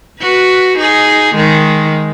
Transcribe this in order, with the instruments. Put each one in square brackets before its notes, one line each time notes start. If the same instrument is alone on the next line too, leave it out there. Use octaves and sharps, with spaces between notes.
[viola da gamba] F#4 B4
D#4 G#4
D#3 G#3